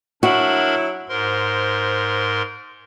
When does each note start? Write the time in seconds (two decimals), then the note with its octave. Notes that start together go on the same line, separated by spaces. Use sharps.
0.23 F#3 D4 E4 F#4 A#4 B5
1.09 G#2 A#4 C5 C6